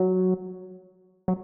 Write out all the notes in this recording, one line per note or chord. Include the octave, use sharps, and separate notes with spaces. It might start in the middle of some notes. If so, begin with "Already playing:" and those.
Already playing: F#3
F#3